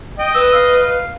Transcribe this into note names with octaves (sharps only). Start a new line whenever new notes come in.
D#5 G5
B4 E6
F5